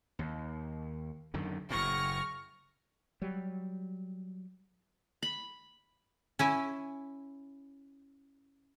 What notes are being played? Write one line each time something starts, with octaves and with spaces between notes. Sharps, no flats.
D#2
F#2 D3 D#3
F#1 A2 C#6 F6 A#6
F#3 G3
B5
C#4 E4 G#5